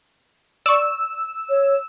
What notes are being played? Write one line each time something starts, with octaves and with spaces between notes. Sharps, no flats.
D5 C#6 E6
C#5